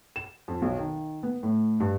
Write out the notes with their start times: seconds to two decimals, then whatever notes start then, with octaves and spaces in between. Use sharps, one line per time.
0.16 E7
0.48 F2
0.62 B1
0.78 D#3
1.23 B3
1.43 A2
1.80 G2